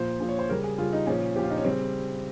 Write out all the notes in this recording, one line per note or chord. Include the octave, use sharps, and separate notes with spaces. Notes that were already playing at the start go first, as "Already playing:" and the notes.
Already playing: A#2 F3 C5
A#2 F3
C#5
C5
C#3 G3 A#4
G#4
C#3 G3 F4
D#4
A#2 F3 C#4
A#2 F3 G4
F4
D#4
C#4
C#3 G3 C4